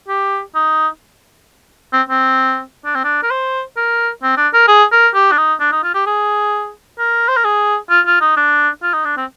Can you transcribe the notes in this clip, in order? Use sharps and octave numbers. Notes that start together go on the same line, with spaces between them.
G4
D#4
C4
C4
D4
C4
D4
A#4
C5
A#4
C4
D4
A#4
G#4
A#4
G4
D4
D#4
D4
D#4
F4
G4
G#4
A#4
C5
A#4
G#4
F4
F4
D#4
D4
F4
D#4
D4
C4